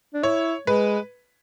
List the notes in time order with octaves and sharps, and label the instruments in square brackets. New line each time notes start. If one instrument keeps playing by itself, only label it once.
[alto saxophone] D4
[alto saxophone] E4 [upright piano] C#5
[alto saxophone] G#3 [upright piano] B4